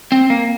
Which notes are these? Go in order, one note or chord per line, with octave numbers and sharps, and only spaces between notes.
C4
A#3